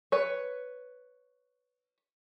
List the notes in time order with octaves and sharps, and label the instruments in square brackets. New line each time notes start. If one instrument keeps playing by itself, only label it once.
[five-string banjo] B4 C#5